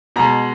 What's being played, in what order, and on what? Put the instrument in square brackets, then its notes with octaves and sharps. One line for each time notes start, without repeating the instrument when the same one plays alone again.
[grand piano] B2 G#3 A#5